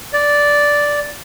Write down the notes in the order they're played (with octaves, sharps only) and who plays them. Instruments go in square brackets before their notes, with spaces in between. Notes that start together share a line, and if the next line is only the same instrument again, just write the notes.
[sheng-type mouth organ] D5